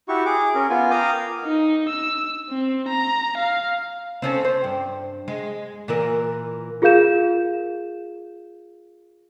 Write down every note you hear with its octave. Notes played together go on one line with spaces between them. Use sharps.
E4 F#4 G4 C#6
G#4 D6
C#4 A#4
B3 F4 G#5
A#4 F5 G5 A#5 D6 D#6
D#4
E6
C4
A#5
F5
C4 C#4 A4
C5
G2
G#3
A#2 E3 A#4
F4 G#4 A#4 F5 G6 E7